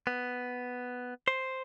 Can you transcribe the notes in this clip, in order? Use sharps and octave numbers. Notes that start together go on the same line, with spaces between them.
B3
C5